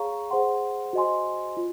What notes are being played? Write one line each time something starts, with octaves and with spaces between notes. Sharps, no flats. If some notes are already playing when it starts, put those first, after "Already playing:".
Already playing: G#4 C#5 F5 A#5 C#6
G#4 C5 F#5 C6
F#4 C5 D#5 G#5 C6
F4